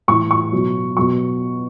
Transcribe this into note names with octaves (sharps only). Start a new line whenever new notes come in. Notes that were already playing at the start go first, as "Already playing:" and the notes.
A2 E3 C#6
C#6
B2 F#3
B2 F#3 C#6